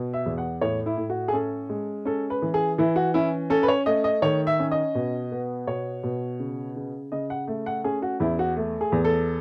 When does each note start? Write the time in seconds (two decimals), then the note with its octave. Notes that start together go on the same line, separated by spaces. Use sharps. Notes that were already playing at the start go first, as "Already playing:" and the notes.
Already playing: B2
0.13 E5
0.26 E2
0.38 F#5
0.61 A2 C#5
0.86 E4
0.97 A2
1.10 F#4
1.28 G#4
1.33 C#4 A4
1.69 G#3
2.05 C#4 A4
2.30 B4
2.42 E3
2.54 G#4
2.78 E3 E4
2.96 F#4
3.14 C#4 E4
3.50 C#4 A4
3.63 B4
3.68 C#5
3.86 A3 D#5
4.04 D#5
4.22 D#3 C#5
4.47 E5
4.60 C#4
4.71 D#5
4.95 B2
5.32 B3
5.67 B2 C#5
6.03 B2
6.40 C#3
6.76 C#3
7.12 C#3 D#5
7.30 F#5
7.47 A3
7.66 F#5
7.84 C#4 G#4
8.02 F#4
8.20 E2 E4
8.39 F#4
8.56 A3
8.81 G#4
8.92 E2
9.05 A4